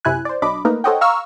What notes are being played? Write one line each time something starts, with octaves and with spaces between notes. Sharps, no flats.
F#2 C3 E4 G#5 F#6
C5 D5
B1 F#3 D4 D#5 B5 D6
A3 A#3 D#4 A#4 B4
A4 C5 C#5 D#5 F#5 G5
F5 A#5 C#6 E6 F6